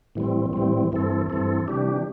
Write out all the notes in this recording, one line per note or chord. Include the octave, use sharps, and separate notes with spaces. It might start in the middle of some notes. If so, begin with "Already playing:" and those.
A2 E3 G3 C4
A2 E3 G3 C4
G2 E3 C4 A4
G2 E3 C4 A4
C3 E3 G3 D4 G4